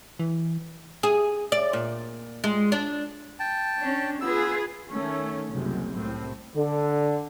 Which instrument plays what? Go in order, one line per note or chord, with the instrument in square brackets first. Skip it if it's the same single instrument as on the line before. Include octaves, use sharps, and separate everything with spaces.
[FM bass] E3
[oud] G#4
D5
A#2
G#3
D4
[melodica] G5 A5
[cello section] C#4 D4
[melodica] B3 E6 [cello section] F4 G#4 B4
[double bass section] D#3 A3 C#4
F#1 C2 F#2 C3
C2 A2 C4
[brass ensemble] D3